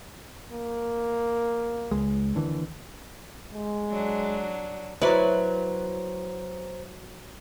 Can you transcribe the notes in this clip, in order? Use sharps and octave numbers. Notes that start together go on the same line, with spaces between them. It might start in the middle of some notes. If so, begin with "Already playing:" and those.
A#3
C#2 G#3
D#2 D3 E3
G#3
F#3 D4
F#3 E4 B4 C5 D5 A#5